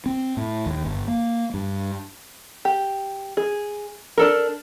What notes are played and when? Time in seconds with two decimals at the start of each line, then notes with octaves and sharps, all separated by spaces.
0.06 C4
0.37 A2
0.66 D#2
0.85 G1
1.08 A#3
1.54 G2
2.65 G4
3.37 G#4
4.18 D4 A4 A#4